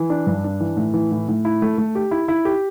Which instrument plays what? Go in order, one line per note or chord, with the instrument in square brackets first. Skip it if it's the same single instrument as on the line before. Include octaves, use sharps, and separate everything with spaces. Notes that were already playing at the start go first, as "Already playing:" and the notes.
Already playing: [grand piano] E3
D4
G2
D4
E3
A2
E3
A2
A2
E4
A3
A3
G4
E4
E4
G4